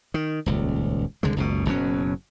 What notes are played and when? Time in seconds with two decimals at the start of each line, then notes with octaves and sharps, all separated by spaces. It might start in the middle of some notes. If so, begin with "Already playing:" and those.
0.14 D#3
0.46 D#1 C#2
1.23 C2 D3 G#3
1.36 F#1 C#2 B2
1.66 F#1 B2 F#3 C#4